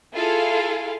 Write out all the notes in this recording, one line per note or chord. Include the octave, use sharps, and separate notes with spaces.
E4 F4 G#4 A4 F5